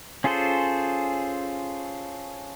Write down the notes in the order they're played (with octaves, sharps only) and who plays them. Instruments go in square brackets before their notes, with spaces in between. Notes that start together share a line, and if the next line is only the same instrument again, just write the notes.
[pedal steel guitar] C#4 F4 G#4 A4 C5